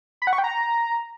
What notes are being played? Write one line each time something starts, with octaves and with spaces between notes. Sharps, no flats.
B5
F#5
C#6
G5
A#5